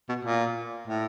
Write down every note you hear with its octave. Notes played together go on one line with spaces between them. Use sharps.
B2
A#2
A2